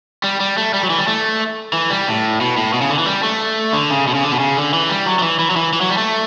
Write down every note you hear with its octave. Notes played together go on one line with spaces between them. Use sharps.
G3
G3
A3
G3
F#3
E3
G3
A3
E3
G3
A2
B2
A2
B2
C#3
D3
E3
G3
A3
D3
C#3
B2
C#3
D3
B2
C#3
D3
E3
G3
F#3
F#3
E3
E3
F#3
E3
E3
F#3
G3
A3